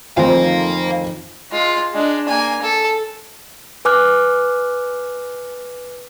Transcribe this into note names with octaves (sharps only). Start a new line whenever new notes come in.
F2 D#3 A3 A#4 C5 F5 G#5
G#3 F4
G#3 D4
A#3 G#5
A4
B4 G#5 D6 F6 F#6